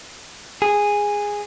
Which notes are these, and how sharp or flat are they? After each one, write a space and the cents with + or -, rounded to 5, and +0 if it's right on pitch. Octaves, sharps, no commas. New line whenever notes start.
G#4 -10